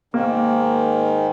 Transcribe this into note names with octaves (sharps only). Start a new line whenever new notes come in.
G#2 D#3 A#3